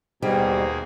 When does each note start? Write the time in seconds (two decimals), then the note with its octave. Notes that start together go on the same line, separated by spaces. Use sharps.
0.22 D#2 G#2 B2 G3 A#3 G#4